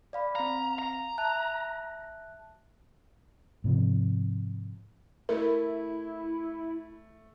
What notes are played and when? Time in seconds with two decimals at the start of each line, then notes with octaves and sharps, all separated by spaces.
0.13 D5 F5 B5
0.36 C4 F5 A#5
0.79 A#5
1.18 E5 A5 F#6
3.64 G#2 C3 F3
5.29 A3 E4 A#4